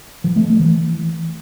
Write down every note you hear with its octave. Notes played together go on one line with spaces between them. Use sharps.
F3
A3
A3
E3